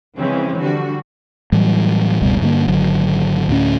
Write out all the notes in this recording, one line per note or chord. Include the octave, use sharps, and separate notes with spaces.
C#3 E3 F3 G#3 C4 C#4
D3 G3 F#4
A2 E3 F#3 G3
F1 C#2 B2 G3
G2 D3 F#3 A#3
G#1 D3 F#3
D2 A2 C#4